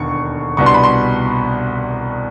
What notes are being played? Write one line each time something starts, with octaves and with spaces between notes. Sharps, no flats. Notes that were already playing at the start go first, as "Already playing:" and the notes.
Already playing: E1 D#2 D3 C#6
C2 B2 G3 B3 D4 C#6
C6
B5
C6